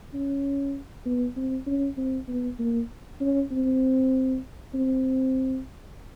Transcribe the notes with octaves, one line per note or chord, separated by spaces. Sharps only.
C#4
B3
C4
C#4
C4
B3
A#3
C#4
C4
C4